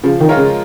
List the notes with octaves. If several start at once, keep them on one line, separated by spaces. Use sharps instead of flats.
C#3 F3
D#3
G#3 F4 A#4 C#5
C#3